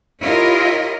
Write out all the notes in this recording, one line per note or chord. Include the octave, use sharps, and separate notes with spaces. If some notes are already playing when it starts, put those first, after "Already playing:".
E4 F4 G4 A#4 C#5 D#5